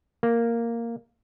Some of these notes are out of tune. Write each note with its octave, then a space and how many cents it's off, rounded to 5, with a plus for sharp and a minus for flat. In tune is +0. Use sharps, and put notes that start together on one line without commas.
A#3 -5